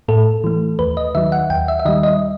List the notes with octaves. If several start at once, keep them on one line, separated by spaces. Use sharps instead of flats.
A2 A4
E3 A3
D#2 B4
D#5
D#3 F#3 E5
F#5
D#2 G5
E5
E5
D#3 G3 D#5
D#5